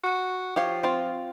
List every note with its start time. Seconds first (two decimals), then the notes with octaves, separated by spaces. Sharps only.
0.04 F#4
0.56 F3 G4 C#5 F5
0.83 C4 F4